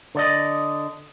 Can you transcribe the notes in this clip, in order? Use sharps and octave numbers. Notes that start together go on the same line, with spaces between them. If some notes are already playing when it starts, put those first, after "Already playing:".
D3 D5 D#5